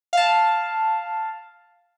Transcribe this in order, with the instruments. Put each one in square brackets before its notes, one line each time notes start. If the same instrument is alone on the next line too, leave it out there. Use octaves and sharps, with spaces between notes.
[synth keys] F5 A5